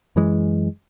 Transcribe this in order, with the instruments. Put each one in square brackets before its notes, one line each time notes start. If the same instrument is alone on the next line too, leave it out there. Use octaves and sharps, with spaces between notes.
[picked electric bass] F#2 E3 G#3